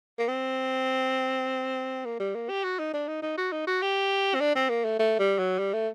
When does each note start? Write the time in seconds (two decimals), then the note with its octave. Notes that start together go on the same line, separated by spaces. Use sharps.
0.19 A#3
0.28 C4
2.06 A#3
2.20 G3
2.35 A#3
2.49 G4
2.64 F#4
2.79 D#4
2.94 D4
3.08 D#4
3.22 D#4
3.37 F#4
3.52 D#4
3.67 F#4
3.82 G4
4.34 C4
4.40 D4
4.55 C4
4.70 A#3
4.85 A3
4.99 A3
5.19 G3
5.38 F#3
5.59 G3
5.73 A3